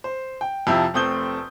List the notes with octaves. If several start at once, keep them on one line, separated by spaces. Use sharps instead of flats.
C5
G5
F2 C3 F3 E4 E5 G5
F1 A3 C4 D#6 G6 G7